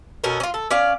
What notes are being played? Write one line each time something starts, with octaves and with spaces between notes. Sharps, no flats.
B2 C#4 A4 A#4
C#4 F4
A4
C#4 D5 F5